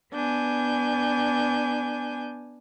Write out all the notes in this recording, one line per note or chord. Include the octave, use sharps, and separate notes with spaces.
B3 D4 G#5 G6